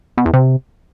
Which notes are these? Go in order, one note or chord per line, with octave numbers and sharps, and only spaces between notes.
B2
E2
C3